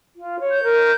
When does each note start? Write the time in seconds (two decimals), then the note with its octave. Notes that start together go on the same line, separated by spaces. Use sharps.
0.15 F4
0.39 C#5
0.51 G6
0.63 A#4